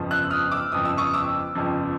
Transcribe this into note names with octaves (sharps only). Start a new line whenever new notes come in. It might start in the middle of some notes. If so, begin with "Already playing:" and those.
Already playing: G1 F2 C#3 F3
E6 F#6
D#6 F6
D6 E6
G1 F2 C#3 F3 D#6
E6
C#6 D#6
D6 E6
G1 F2 C#3 F3